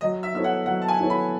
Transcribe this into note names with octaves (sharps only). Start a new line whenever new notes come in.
F#3 D#5
E5
B3 E4 A4 C#5 E5
F#5
F#3 F#5
A5
G#5
B3 E4 A4 C#5
B5